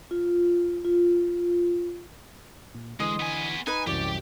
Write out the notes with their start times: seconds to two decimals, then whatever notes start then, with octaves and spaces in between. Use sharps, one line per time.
0.11 F4
0.85 F4
2.74 A#2
3.00 D3 E3 G#3 D#5 C6
3.20 B3 G#5
3.67 D#4 B4 G#5 B5
3.87 C2 F#2 E3 G4 C#5 D5